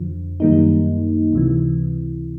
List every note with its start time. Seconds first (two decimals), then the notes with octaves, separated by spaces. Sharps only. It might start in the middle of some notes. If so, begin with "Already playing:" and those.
Already playing: F2 D3 F3
0.40 F#2 D#3 G3 A#3 D#4
1.33 C#2 C3 E3